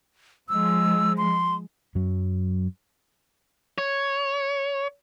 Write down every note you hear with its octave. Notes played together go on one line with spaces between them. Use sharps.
F3 G#3 E6
C6
F#2 F#3
C#5